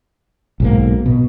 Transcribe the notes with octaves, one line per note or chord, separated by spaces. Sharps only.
B1 G#2 A#3
B2